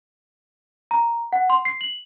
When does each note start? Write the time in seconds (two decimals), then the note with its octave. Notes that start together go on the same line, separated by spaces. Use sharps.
0.91 A#5
1.33 F#5
1.50 C6
1.65 C7
1.81 F#7